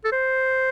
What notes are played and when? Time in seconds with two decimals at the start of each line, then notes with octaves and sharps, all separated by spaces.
0.04 A4
0.12 C5